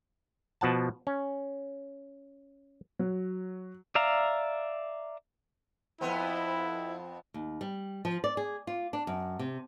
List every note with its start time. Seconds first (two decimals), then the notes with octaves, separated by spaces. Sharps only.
0.61 B2 F3 F#5 A5
1.07 C#4
2.99 F#3
3.95 D5 E5 F5 A#5
6.01 F2 B3 C4 E4
7.34 D#2
7.61 G3
8.05 F3
8.24 D5
8.37 G#4
8.67 F4
8.93 D4
9.07 F#2
9.39 C3